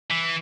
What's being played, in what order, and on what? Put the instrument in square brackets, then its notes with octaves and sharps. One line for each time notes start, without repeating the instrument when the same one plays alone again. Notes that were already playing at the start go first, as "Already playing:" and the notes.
[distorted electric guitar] E3